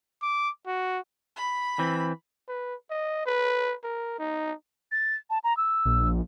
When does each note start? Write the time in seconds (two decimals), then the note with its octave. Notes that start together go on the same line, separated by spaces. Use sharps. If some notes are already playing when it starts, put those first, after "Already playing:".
0.22 D6
0.67 F#4
1.37 B5
1.79 E3 C4
2.49 B4
2.90 D#5
3.26 B4
3.84 A#4
4.19 D#4
4.92 A6
5.30 A5
5.44 A#5
5.57 E6
5.85 A#1